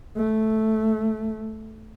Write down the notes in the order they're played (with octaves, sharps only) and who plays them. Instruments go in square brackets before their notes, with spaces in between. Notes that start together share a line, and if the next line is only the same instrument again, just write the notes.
[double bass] A3